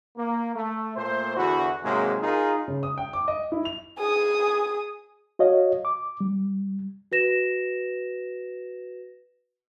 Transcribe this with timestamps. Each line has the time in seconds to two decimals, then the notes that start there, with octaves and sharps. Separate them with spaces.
0.17 A#3
0.56 A3
0.96 A#2 A3 C5
1.36 E2 D3 E4 F#4
1.84 G#2 C3 F#3 G#3 A#3
2.21 D#4 F4 G#4 A#4
2.68 C#3
2.83 D#6
2.98 G5
3.13 D6
3.28 D#5
3.52 E4
3.65 F7
3.98 G#4 D#6
5.39 F#4 C#5 D#5 F5
5.85 D6
6.21 G3
7.12 F#4 B4 A#6 E7